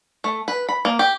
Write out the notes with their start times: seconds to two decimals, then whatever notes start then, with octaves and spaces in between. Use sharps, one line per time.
0.24 A3
0.48 B4
0.69 B5
0.85 A#3
0.99 G4